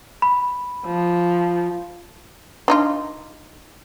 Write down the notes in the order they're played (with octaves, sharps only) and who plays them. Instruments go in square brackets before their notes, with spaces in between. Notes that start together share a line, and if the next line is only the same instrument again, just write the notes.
[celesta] B5
[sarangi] F3
[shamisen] D4 D#4 F4